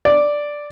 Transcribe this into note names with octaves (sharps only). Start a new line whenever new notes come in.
D5